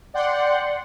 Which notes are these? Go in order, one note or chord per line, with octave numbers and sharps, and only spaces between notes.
D5 F#5 G5 C6